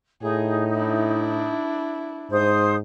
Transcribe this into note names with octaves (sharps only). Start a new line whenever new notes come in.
A2 D#4 G#4
D4 E4
G#2 C5 D#6